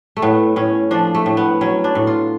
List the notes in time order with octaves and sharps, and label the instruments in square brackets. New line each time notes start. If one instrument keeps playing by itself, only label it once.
[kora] A3
A2 B3
A2 C#4
F3 D4
A3
A2
B3
F#3 C#4
D4
A2
F4